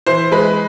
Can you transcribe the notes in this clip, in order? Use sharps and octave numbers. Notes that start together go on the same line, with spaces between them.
E3 C5
G#3 B4